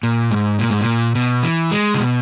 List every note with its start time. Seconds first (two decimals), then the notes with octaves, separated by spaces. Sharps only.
0.03 A#2
0.31 G#2
0.59 A#2
0.70 G#2
0.81 A#2
1.15 B2
1.43 E3
1.71 G#3
1.94 C#3
2.00 B2